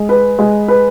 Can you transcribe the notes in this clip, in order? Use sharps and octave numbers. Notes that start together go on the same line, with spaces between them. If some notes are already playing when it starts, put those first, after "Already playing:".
Already playing: G#3
B4
G#3
B4